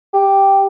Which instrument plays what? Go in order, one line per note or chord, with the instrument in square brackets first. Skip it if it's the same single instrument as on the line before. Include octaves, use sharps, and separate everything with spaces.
[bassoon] G4